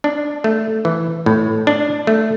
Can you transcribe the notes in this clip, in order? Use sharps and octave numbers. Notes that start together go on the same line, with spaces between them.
D4
A3
E3
A2
D4
A3